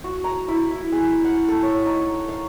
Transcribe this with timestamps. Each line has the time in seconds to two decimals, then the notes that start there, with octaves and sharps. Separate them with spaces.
0.04 F#4
0.24 A#5
0.48 E4
0.70 E4
0.92 G#4
1.24 F#5
1.48 A4
1.63 C#5
1.86 D#4
2.29 F5